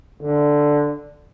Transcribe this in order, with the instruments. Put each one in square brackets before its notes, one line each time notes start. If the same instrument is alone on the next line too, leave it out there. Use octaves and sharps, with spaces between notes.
[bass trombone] D3